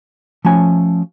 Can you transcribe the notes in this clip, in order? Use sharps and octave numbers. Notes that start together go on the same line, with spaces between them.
F3 A3 C#4 G#5